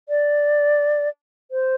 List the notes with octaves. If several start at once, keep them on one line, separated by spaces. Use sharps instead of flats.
D5
C5